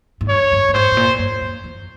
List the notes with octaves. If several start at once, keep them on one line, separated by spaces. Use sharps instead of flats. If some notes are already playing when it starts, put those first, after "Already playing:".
G#2
G2 C#5
G2
G2
G#2 C5
G#2
A#2
G2
G2
E2